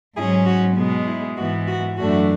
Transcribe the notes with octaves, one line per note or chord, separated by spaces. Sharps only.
G#2 F#3 C#4 E4 G#4
F#4
B2 G#3 B3
E4
G#2 E3 B3 F#4
F#4
F#2 E3 A3 D4 F#4